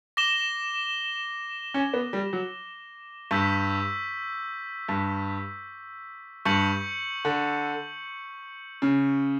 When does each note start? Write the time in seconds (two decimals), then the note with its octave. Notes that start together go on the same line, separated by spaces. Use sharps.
0.17 D6 A#6 E7 G7
1.74 C#4
1.94 B3
2.13 G3
2.33 F#3
3.31 G2 C#6 E6 G6 B6
4.89 G2
6.45 G2 C#6 G6 C#7 F#7
7.25 D3
8.82 C#3